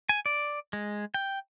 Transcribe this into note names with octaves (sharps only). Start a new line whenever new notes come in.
G#5
D5
G#3
G5